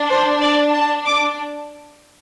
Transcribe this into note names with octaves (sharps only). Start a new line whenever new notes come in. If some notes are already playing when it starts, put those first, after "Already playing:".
Already playing: D4
C5
D5
A5
D6